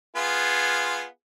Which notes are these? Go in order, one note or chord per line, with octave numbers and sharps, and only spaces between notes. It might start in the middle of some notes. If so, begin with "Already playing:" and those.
B3 F4 G#4